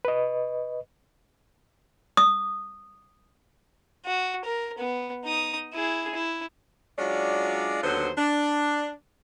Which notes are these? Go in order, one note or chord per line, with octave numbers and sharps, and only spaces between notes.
B4 D#5
D#6
F#4
A#4
B3
D#4 D#6
E4 G#4
E4
F#3 G#3 C#4 D4 F4 D5
D#2 D3 F#3 B3 C5
D4